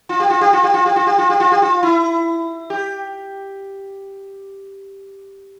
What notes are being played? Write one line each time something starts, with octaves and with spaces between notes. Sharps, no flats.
F4
G4
F4
G4
F4
G4
F4
G4
F4
G4
F4
G4
F4
G4
F4
E4
G4